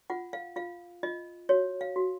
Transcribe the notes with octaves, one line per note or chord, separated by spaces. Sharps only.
F4 F#5
F5
F4 F5
F4 D#5
F#4 C#5
F5
F#4